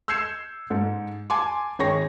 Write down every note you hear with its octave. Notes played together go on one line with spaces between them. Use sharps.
E6 G6 G#6 C7 C#7 E7
G#2 A4
G#5 A5 C6 D6
G#1 G#4 C#5 G5 C#6 A#6